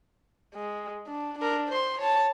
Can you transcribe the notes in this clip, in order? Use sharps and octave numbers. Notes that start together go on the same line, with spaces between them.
G#3
D4
D4 A#4
C5 C6
C#5 A5